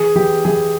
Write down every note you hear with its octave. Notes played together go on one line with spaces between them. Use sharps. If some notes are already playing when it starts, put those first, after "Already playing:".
Already playing: E3 G#4
E3 G4
E3 G#4